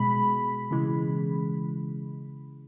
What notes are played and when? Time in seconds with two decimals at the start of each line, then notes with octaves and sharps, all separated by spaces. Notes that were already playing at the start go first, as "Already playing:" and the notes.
Already playing: B2 G#3 B5
0.71 C#3 E3 G#3